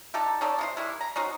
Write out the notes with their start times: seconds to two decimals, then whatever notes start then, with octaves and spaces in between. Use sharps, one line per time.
0.14 D3 D#4 G4 A4
0.41 C#4 D#4 A4 D5
0.59 C3 F4 C5
0.77 D#3 G3 G#3 E4
1.01 A#5
1.16 C#4 D#4 F#4 C5